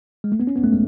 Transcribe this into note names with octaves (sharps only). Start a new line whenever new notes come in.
G#3
A3
B3
C#4
B3
A3
G#3